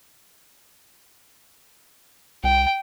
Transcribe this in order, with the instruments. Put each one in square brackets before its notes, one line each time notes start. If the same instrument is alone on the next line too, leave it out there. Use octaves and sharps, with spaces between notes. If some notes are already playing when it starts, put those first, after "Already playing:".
[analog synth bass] C2 [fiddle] G5